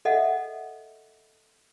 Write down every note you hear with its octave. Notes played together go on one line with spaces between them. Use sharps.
A4 D#5 E5 F#5